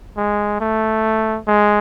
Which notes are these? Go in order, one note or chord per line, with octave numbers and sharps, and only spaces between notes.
G#3
A3
G#3